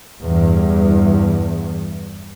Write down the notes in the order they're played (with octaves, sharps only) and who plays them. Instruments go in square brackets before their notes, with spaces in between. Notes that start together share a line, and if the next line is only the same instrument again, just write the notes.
[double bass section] E2 G2